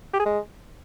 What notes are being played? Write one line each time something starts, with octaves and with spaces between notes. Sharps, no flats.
G4
G#4
G#3